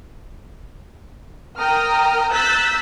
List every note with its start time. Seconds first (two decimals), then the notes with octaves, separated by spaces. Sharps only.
1.59 A#4 G5 A#5 D#6 F6
2.31 A#5 E6 F#6 G6 A6 B6